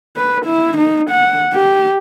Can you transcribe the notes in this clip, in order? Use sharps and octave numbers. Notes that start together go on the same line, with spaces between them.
B4
E4
D#4
F#5
G4